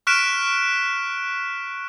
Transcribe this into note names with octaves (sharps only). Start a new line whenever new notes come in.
C#6 F6 F#6 B6 D7 E7